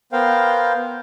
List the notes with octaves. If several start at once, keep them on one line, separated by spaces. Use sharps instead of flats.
B3 A#4 C5 F5 G5